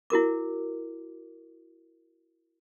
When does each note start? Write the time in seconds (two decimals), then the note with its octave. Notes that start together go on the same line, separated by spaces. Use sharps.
0.10 E4 F#4 A#4 D6